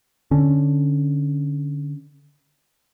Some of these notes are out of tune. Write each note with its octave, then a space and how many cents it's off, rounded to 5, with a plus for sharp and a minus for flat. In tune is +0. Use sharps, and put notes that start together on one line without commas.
D3 +0 C#4 +0